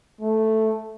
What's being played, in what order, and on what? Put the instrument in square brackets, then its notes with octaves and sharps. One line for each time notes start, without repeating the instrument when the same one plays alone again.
[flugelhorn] A3